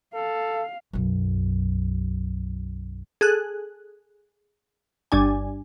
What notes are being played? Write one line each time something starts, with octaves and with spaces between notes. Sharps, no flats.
A4 F5
B1 F#2
G#4 A4 F#6
G1 G2 D4 G#5